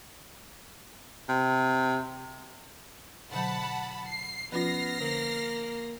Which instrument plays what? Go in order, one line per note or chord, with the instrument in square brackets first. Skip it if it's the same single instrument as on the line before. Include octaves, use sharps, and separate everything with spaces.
[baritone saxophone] C3
[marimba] B2 D3 F#3 [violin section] F#5 A5 B5
[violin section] C7
[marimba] F3 C#4 F4 [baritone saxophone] B3 [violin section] F6 A#6 C7
[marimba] D3 [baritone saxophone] A#3